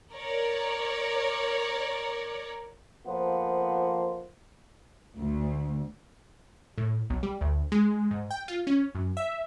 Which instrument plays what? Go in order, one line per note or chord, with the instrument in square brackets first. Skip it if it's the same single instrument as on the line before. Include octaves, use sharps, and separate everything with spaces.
[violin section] A#4 C#5 D5
[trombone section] F2 F3 A#3 B3 C5
[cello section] D2
[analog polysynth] A2
B1
G3
D2
G#3
G#2
G5
F4
C#4
F#2
E5